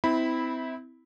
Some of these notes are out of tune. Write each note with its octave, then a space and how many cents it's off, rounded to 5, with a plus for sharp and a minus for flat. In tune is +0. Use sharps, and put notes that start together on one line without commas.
C4 -25 E4 -20 B5 +0